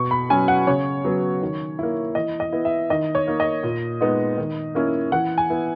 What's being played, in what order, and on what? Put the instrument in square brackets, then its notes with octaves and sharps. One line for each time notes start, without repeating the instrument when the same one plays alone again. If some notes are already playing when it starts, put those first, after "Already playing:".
Already playing: [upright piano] B2 C#6
B5
F#3 C#4 G#5
F#5
C#3 C#5
F#3 B3
D#3
A#3 E4
E3 D#5
D#5
B3 E4
E5
D#3 D#5
C#5
A#3 D#4
D#5
A#2
G#3 B3 D#4
D#3
A#3 C#4 E4
E3 F#5
G#5
B3 E4